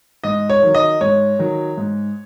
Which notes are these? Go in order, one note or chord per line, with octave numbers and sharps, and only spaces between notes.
G#2 D#5
C#5
D#3 F#3
D#5
G#2 C#5
D#3 F#3
G#2